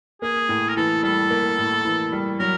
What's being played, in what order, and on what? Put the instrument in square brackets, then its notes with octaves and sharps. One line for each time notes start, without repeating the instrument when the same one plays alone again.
[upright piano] A#3 [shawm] G#4
[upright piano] A2
[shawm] A#4
[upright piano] E3 [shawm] A4
[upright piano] G3 [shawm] A4
[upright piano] A#3
A2
E3
G3
[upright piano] F#3 [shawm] A#4